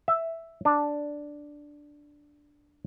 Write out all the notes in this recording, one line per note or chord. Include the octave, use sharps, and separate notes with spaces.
E5
D4